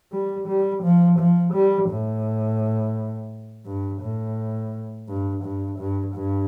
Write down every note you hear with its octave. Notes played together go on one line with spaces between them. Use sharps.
G3
G3
F3
F3
G3
A2
G2
A2
G2
G2
G2
G2